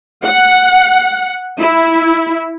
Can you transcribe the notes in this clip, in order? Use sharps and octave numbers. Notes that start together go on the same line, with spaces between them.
F#5
E4